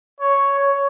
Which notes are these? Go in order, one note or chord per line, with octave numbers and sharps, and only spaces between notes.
C#5
C#5